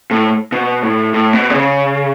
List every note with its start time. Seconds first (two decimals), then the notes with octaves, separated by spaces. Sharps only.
0.11 A2
0.52 B2
0.82 A2
1.14 A2
1.33 B2
1.50 D3
1.54 C#3